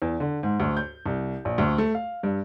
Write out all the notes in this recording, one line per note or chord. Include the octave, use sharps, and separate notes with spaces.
E2
D3
G#2
D2
G6
C2
A#1
D2
A3
F5
G2